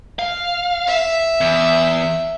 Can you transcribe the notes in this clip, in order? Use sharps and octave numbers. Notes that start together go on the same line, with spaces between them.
F5
E5
E2